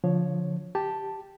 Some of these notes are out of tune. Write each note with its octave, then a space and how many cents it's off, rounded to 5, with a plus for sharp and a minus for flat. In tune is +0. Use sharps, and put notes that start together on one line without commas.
D3 -35 F3 +5 C#5 +0
G4 +0 A5 +0